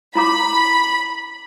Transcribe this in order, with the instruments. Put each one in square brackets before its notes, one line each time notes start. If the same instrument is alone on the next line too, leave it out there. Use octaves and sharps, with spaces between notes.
[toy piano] E4 A#5 D6 [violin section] B5